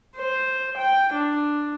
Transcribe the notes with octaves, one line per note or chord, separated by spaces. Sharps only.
C5
G5
D4